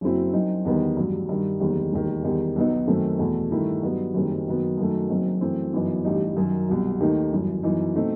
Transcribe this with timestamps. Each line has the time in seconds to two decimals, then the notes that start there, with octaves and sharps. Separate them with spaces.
0.01 F#1 F#2 F#3 C4 E4
0.33 F#2 F#3 C4 D#4
0.65 E2 D#3 G3 B3 D#4
0.97 A1 G2 F#3
1.29 G2 D#3 G3
1.60 F#1 E2 D#3 G3
1.92 E1 D#2 D#3
2.24 E2 D#3 G3 D#4
2.56 B1 B2 F#3 B3 D#4
2.87 F#2 D#3 A3 C4
3.19 E2 B2 A3
3.51 G2 D#3 A3 E4
3.82 G2 F#3 B3 D#4
4.14 F#1 F#2 D#3 G3 C4
4.46 F#1 F#2 D#3 F#3 B3
4.77 F#2 D#3 F#3 A3
5.09 F#1 F#2 F#3 C4 D#4
5.41 F#2 E3 A3 C4
5.73 G1 F#2 E3 B3 D#4
6.05 A1 G2 E3 G3 D#4
6.37 F#2 D#3 F#3
6.68 C2 B2 F#3
7.00 D#2 D#3 A3 D#4
7.32 G1 F#2 E3
7.63 F#2 E3 B3 D#4
7.95 B2 A3 C4 D#4